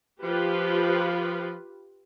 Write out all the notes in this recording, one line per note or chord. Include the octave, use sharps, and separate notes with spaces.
F3 F4 G4 B4